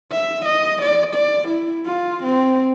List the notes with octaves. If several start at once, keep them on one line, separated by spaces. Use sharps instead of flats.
E5
D#5
D5
D5
E4
F4
C4